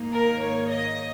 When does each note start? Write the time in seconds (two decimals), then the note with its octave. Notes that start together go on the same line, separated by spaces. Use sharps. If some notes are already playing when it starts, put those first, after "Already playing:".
Already playing: G#2 D#3 A#3 D#4
0.12 A#4
0.40 C#5
0.68 D#5